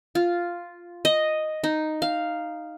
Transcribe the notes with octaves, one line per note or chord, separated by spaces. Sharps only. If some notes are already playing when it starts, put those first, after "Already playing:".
F4
D#5
D#4
F5